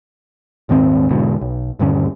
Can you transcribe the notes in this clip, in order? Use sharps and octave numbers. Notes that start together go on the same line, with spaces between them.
D#1 G#2 D#3 C4
E2 G#2 B2 D3
B1
D#1 G2 D3 C#4